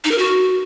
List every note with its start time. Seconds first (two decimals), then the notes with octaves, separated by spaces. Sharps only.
0.04 D#4
0.11 A#4
0.18 F#4